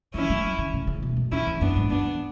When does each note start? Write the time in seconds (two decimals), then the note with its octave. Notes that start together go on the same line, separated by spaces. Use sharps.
0.14 E3 C#4 E4
0.30 F#3
0.58 D3
0.74 C#3
0.87 C#3
1.03 B2
1.17 F#2
1.32 E2 C#4 E4
1.47 E2
1.61 F#2 B3 D4
1.76 G#2
1.90 F#2 B3 D4
2.06 E2